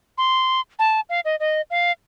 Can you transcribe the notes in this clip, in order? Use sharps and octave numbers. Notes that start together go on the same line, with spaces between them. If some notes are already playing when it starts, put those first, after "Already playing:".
C6
A5
F5
D#5
D#5
F5